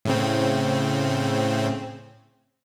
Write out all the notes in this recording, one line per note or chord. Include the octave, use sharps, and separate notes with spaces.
A2 C#3 C4